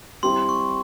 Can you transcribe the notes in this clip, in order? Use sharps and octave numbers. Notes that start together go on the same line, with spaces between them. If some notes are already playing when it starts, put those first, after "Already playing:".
G3 C4 E4 G4 C6
C#6